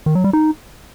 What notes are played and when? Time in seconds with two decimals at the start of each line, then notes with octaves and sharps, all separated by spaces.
0.06 D#3
0.15 F#3
0.24 G3
0.33 D#4